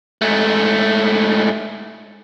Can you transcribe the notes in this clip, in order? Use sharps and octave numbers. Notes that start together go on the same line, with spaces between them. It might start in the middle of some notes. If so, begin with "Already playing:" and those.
G#2 A3